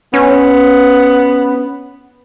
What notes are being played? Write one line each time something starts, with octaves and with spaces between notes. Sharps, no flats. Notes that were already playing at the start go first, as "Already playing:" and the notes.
B3 C#4